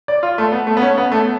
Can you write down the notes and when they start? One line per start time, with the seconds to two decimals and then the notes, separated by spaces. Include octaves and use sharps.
0.08 D5
0.23 F4
0.38 A3
0.52 B3
0.67 A3
0.77 B3
0.82 C#4
0.98 B3
1.12 A3